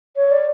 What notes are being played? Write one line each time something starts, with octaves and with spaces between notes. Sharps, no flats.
C#5
D5